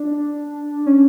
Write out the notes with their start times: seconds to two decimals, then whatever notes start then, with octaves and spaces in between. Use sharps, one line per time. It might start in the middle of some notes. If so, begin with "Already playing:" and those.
Already playing: D4
0.86 C#4